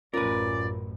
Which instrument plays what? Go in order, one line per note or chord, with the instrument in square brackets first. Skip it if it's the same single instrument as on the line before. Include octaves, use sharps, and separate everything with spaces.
[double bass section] A1 F#2 [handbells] C#4 F4 [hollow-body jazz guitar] A#4 B4 [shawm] D5